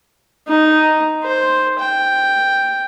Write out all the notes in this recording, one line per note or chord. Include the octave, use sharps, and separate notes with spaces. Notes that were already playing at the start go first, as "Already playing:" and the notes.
D#4
C5
G5